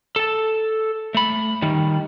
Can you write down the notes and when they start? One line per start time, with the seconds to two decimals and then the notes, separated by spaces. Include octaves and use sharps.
0.16 A4 A5
1.15 A3 B5
1.62 D#3 G3